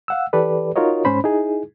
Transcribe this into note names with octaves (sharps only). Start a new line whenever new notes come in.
F5 F#5 E6
E3 G4 A4 B4 D5
D#4 F4 F#4 A#4 C#5 D#5
G#2 C#4 C5 B5
D#4 E4 G#4